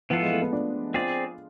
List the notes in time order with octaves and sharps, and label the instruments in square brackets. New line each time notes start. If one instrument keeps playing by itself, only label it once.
[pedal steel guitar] E3 B3 F4 A4 [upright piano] F3
[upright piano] G#3
A3
B3
D4
[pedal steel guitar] C4 G#4 D5 [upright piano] F4